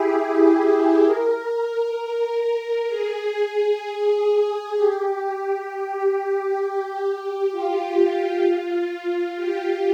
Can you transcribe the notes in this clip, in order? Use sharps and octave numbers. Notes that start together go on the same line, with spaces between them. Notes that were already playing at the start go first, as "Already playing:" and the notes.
Already playing: E4 G4 G#4
G#4
A#4
G#4
G4
G4
F4
G4